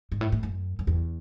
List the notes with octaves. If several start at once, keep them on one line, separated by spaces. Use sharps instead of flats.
G#2
A2
A2
F#2
F#2
E2